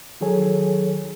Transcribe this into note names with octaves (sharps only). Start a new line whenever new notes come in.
D#3 F#3 G#4 A4 C#5 G#5